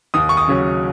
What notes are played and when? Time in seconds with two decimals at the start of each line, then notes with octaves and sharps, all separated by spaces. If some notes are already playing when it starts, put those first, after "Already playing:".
0.14 D#2 D#6
0.29 C#6
0.37 D#6
0.48 C#3 F#3 C#4